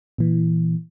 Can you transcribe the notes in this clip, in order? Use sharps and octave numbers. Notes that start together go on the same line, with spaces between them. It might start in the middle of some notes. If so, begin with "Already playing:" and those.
A#2 E3